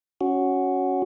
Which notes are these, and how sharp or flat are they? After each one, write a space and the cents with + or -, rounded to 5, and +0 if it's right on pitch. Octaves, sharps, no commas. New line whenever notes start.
C#4 +0 F#4 +0